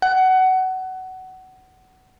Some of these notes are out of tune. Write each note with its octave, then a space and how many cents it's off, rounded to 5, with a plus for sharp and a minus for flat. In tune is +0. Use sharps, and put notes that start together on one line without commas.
F#5 +20